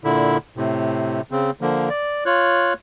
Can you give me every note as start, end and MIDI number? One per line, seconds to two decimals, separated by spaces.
0.04 0.37 46
0.04 0.37 50
0.04 0.37 64
0.57 1.21 45
0.57 1.21 48
1.31 1.51 49
1.31 1.51 60
1.61 1.89 50
1.61 1.89 53
1.61 1.89 58
1.90 2.24 74
2.25 2.73 65
2.25 2.73 73
2.25 2.73 90